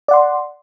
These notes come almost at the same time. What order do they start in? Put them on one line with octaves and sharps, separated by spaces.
D5 F#5 C6